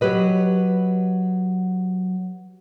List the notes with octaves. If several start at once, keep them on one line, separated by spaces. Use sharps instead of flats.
F#3 G4 B4 D#5